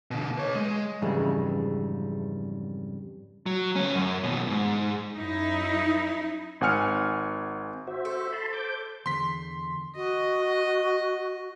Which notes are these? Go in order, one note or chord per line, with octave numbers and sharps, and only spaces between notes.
B2 D3
B4 C#5
G#3
F2 G#2 C#3 E3 G3 G#3
F#3
D2 C#4
F#2
D#2 B2
E2 G#2
F#2 D#4 E4
G#1 F#5 G#5 F6 C#7
F#4 C5 E5
A4
A5 B5 C6
C5 D6 G6
E2 D3 C6 B6
F#4 D#5